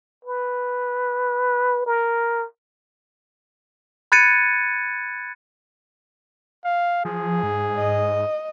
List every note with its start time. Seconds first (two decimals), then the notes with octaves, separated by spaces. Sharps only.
0.25 B4
1.86 A#4
4.12 B5 F#6 G#6 A6 C#7 D#7
6.65 F5
7.05 F3 G#4
7.43 G#2
7.78 D#5